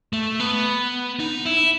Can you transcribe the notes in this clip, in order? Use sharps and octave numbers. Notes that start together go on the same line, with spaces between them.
A3
B3
D#4
E4